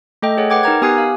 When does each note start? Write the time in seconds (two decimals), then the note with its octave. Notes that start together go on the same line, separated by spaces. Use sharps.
0.22 A3 A4 D#5 G5
0.37 G#4 C#5 F#5
0.50 B4 F#5 G5 D6 G#6
0.63 D#4 A#4 A#5 G#6
0.82 B3 G4 G#5 D#6 F#6 C7
0.98 F5